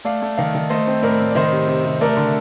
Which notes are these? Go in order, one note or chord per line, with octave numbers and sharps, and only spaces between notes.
A3 D5 F5
A3
D#3 D5 F5
D#3
A3 C5 D#5
C4
A2 A#4 D5
A2
D5
D#3 C5 D#5
C3
C3
C3
A3 A#4 D5
D3